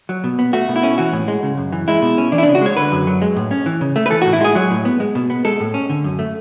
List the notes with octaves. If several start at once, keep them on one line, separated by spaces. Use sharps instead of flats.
F#3
B2
B3
A3 F#4
B2
E4
C#4
E3 F#4
A2
G#3
C#3
F#2
E3
G#3 E4
B2
C#4
E3 D4
E4
C#3 D4
F#4
G#3 C#5
D3 B4
F#2
F#3
G#3
A2
C#4
E3
C#3
A3
B4
E3 A4
A2 F#4
E4
G#3 G#4
F#3
A2
B3
G#3
B2
B3
G#3 A4
A2
C#4
D3
F#2
A3